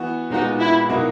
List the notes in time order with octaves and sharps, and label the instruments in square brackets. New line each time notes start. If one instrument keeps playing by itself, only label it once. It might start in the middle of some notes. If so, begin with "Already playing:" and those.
Already playing: [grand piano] E3 B3 F#4
[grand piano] A#2 G#3 B3 F#4 [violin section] D#4
[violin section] E4
[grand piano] B2 F#3 A#3 D#4 F#4